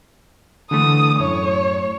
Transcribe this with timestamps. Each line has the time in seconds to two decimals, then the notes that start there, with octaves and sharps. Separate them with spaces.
0.71 D3 E3 A3 D#6
1.19 F#2 A2 C#5